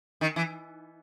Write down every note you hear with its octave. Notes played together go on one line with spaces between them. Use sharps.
D#3
E3